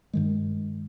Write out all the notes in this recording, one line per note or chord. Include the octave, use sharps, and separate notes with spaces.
G2 D#3 G#3